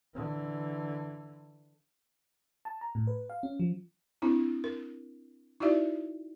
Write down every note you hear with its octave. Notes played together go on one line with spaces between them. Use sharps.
D3 E3
A5
A#5
A2
B4
F5
C#4
F3
C4 D4 E4
A#4
D#4 E4 F#4 D5 E5